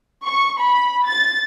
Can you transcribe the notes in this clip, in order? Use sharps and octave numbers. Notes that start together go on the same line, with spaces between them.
C#6
B5
A6